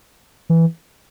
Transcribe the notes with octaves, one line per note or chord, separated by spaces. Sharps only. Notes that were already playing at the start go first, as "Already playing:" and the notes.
E3